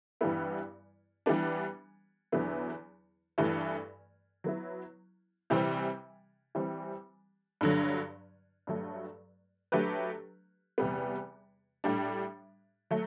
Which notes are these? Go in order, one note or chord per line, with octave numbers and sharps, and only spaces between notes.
G2 E3 G3 B3 E4
E3 G3 B3 D4
E2 D3 F#3 B3 E4
G2 E3 A3
F#3 B3 E4
C3 E3 G3 C4
E3 G3 C4
G2 D3 F#3
G2 F#3 A3
F#3 A3 D4 G4 B4
E2 C3 G3 B3
A2 G3 D4
F#3 A3